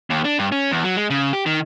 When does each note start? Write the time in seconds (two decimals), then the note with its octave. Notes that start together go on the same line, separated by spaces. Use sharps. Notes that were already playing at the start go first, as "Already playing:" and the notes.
0.10 D#2
0.25 D4
0.39 G2
0.52 C#4
0.71 E2
0.84 F#3
0.96 G#3
1.10 C#3
1.33 G4
1.46 D#3